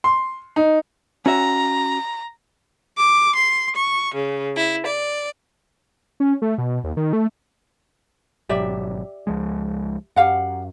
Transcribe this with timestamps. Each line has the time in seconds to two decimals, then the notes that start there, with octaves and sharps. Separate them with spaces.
0.04 C6
0.56 D#4
1.26 C#4 F#4 E5 A#5
2.97 D6
3.35 C6
3.75 C#6
4.14 C#3
4.56 E4
4.86 D5
6.20 C#4
6.42 A3
6.58 B2
6.84 D#2
6.97 D#3
7.13 A3
8.49 G#1 B2 F#3 G4 D5 E5
9.27 C#2 F3 G#3
10.16 F#2 G4 F5 F#5